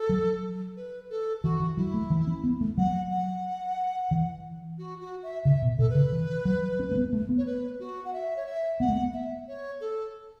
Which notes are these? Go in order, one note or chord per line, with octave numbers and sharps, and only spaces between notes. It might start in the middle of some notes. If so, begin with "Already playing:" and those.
Already playing: A4
F#3
B4
A4
E3 F#4
E3
F#3 E4
A3
E3
C#4
B3
A3
F#3 F#5
F#5
E3
F#4
F#4
E5
C#3 E5
B2
B2 A4
B4
C#3
E3
F#3
C#4
A3
B3
A3
B3
C#5
B4
F#4
F#5
E5
C#5
E5
B3 F#5
A3
B3
E5
C#5
A4